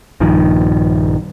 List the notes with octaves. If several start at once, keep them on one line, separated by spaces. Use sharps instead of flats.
A#1 G2 D#3 F3